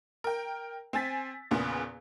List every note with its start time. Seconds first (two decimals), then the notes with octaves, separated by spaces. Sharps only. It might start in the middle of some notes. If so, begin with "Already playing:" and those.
0.24 A#4 G5
0.93 C4 G#5 A6 B6
1.51 E2 A#2 C#3 B3